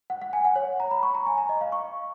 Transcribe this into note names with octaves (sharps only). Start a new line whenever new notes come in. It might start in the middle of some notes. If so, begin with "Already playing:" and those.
F#5
F#5
G#5
F#5
C#5
A#5
B5
C#6
A#5
G#5
A#5
D#5
F5
C#6